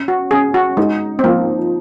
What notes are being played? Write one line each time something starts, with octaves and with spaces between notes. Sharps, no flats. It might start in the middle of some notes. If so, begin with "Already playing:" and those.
Already playing: C#4
F#4
C#4 G#4
F#4
G#3 D#4
C4
F3 A#3